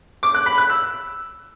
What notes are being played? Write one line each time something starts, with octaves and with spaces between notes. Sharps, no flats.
D6
F#6
B5
F#6
E6